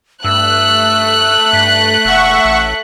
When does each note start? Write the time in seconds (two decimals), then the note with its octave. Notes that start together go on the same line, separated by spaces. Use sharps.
0.24 G2 A3 E6 F#6
1.53 G2 B6
2.05 E1 E5 F#5 C#6
2.45 A1